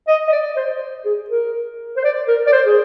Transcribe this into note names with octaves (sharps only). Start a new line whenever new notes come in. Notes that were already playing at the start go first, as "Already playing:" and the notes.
D#5
D#5
D5
C5
G#4
A#4
C5
D5
A#4
D5
C5
G#4